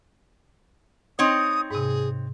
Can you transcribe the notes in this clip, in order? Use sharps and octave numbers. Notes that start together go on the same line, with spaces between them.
C4 D#4 C#5 D#6
G#2 C3 G#4